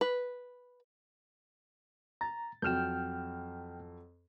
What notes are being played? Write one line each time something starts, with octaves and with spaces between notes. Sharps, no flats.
B4
A#5 A6
F2 F#3 G5 F6 G6 E7